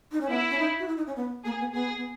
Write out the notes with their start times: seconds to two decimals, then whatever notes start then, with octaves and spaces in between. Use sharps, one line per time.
0.12 D#4
0.21 C#4
0.29 B3 E4
0.50 C#4
0.59 D#4
0.79 F#4
0.88 E4
0.97 D#4
1.07 C#4
1.16 B3
1.44 A#3 G#4
1.59 B3
1.73 B3 G#4
1.97 B3